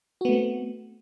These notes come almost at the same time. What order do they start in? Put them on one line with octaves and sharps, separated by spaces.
F#4 B3 A3 C4